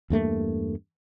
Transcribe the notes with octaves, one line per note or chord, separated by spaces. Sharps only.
E2 G2 A3 A#3